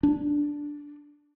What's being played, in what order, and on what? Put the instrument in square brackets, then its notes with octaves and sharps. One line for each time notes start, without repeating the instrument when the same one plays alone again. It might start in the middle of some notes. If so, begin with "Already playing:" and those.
[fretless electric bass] D4